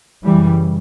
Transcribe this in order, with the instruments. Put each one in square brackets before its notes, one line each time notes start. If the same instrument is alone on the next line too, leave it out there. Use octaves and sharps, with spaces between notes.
[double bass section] F#2 C#3 E3 G3